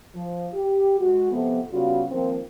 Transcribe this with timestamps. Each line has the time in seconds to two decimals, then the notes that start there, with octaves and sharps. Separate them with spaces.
0.15 F3
0.54 G4
0.99 G#3 F#4
1.31 C3 F3 A3 B3
1.71 C#3 G3 B3 F4 F#4
2.11 D#3 F3 A#3 C4